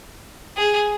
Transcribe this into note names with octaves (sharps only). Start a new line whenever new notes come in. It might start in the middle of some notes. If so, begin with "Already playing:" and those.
G#4